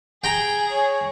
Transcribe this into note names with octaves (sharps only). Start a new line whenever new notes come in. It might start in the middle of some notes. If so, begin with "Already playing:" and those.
G#4 G5 A#5
C#5